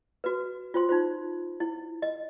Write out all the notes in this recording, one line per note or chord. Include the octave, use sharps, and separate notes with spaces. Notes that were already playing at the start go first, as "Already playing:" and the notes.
F#4 B4
F4 C5 C6
D#4 F4 C5
E4
D#5